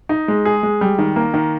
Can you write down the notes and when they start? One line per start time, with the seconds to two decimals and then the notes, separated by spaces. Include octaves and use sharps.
0.09 D#4
0.28 G#3
0.45 G#4
0.63 G#3
0.81 G3
0.98 D#3
1.16 A#3
1.34 D#3